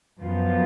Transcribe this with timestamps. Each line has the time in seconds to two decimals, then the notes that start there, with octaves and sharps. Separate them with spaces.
0.18 F#2 F3 B3 F4